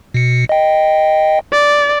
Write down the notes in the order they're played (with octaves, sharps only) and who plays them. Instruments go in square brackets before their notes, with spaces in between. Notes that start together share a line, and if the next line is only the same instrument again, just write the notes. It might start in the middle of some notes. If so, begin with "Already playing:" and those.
[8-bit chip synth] B2 C#7
D#5 G5
[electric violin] D5